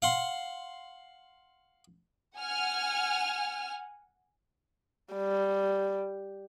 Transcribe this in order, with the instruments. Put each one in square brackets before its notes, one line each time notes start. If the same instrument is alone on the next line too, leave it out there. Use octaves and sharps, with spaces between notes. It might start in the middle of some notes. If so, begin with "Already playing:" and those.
[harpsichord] F5 F#5 C6
[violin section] F#5 G#5 F6
[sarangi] G3